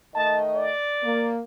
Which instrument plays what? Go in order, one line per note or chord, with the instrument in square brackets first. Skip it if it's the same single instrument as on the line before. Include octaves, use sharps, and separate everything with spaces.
[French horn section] D#3 A3 D#5 [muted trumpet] A5
[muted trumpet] D5
[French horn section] A#3